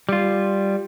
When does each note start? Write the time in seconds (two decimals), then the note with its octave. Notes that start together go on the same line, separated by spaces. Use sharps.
0.09 G3 F4